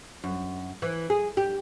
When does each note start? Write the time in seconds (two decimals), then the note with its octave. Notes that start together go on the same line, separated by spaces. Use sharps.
0.24 F#2
0.82 E3
1.10 G#4
1.37 G4